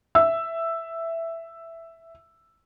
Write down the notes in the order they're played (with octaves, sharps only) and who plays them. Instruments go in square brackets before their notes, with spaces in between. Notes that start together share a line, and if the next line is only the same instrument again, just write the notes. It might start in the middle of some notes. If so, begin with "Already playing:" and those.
[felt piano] E5 E6